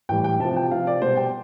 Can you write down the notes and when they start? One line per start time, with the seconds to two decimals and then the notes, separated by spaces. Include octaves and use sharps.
0.09 A2 E3 G3 G5
0.24 G5
0.40 C3 F3 A5
0.56 G5
0.71 C3 F3 F5
0.87 D5
1.02 B2 G3 C5
1.17 G5